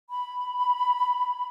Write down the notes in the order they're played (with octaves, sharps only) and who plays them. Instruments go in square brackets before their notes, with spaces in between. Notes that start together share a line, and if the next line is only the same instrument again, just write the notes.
[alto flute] B5